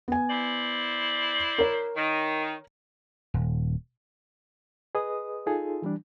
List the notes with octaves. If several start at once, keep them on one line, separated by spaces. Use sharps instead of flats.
B3 G#5
E4 C5 D5
A#4 C#5
D#3
D#1
G#4 B4 D#5 D#6
D#4 F4 G#4 A4
E3 G3 D4